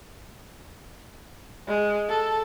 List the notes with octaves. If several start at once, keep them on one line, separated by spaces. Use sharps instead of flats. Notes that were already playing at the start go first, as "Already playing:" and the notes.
G#3
A4